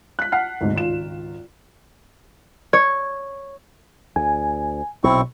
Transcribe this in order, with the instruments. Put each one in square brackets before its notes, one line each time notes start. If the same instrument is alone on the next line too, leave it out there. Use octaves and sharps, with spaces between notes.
[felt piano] F#6 B6
F#5 A5 F6 C7
D2 G#2 C3
G#1 C#2 F4 E7
[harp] C#5
[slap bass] D2 [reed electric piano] G#5
[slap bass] B1 [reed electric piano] B2 [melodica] C4 E4 C#6